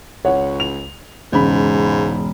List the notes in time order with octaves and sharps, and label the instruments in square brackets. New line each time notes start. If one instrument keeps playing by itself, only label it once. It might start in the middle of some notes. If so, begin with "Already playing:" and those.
[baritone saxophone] C#2 [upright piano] C#5 F#5
[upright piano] F7
[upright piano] E1 C#3 B5 [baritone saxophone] G#2